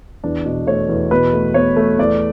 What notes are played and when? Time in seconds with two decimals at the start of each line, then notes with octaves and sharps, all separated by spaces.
0.24 E2 D4
0.46 B2
0.67 A3 C#5
0.89 E2
1.11 B2 B4
1.33 A3
1.54 B2 C#5
1.77 A3
1.98 E2 D5